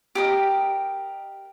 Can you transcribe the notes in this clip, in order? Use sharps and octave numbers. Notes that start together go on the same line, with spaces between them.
G4 A#4 D#5